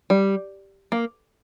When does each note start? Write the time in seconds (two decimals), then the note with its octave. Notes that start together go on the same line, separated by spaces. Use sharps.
0.10 G3
0.92 A#3